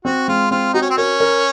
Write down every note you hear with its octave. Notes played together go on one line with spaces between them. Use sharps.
C4 F#4
G#3 F4
C4 F4
D#4 F#4
C#4
C4
C#4 A#4
A#4